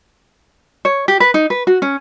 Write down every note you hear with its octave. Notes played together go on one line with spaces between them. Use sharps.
C#5
G4
B4
D#4
B4
F#4
C#4